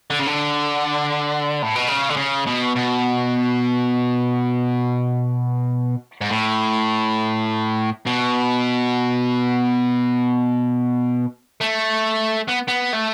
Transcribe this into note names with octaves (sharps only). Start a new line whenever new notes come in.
D3
C#3
D3
A2
B2
C#3
D3
C#3
B2
B2
G#2
A2
B2
A3
B3
B3
A3